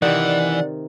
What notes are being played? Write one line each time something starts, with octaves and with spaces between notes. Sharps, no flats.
C3 D#3 E3 D5 F#5